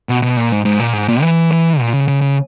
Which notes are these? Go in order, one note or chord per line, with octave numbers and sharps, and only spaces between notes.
B2
B2
A#2
G#2
G#2
A#2
G#2
A#2
E3
E3
A#2
C#3
C#3
C#3